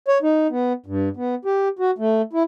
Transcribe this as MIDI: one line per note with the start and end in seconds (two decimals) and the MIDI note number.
0.08 0.18 73
0.22 0.47 63
0.50 0.73 59
0.86 1.09 43
1.16 1.35 59
1.45 1.68 67
1.79 1.91 66
1.98 2.22 57
2.33 2.43 64